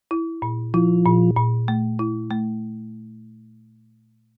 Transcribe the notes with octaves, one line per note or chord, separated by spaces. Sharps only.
E4
A#2
F3 E4
A#2
A#2
A3
E4
A3